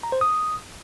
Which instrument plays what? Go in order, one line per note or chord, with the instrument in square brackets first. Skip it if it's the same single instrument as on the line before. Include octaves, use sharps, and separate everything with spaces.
[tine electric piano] A#5
C5
D#6